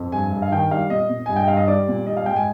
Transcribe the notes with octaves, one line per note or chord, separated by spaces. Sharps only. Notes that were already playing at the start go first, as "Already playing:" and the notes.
Already playing: F2
G2 G#5
G2
F5
D#3 G5
G3 F5
A#2 D#5
A#2
G2 G#5
G5
G2 F5
D#5
G3 D5
A#2
G3 D#5
F5
G#2 G5
G#5